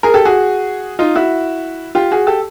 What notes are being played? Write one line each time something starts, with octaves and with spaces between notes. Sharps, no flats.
G#4 A#4
G4 A4
F#4 G#4
D#4 F4
E4 F#4
F4 G4
F#4 G#4
G4 A4